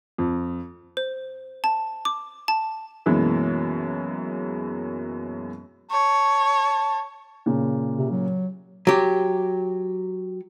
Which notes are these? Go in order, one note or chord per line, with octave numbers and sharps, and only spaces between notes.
F2
C5
A5
D6
A5
F#2 B2 E3 G#3 A#3
C#5 A5
A#2 C#3
C3
F#3
F#3 G4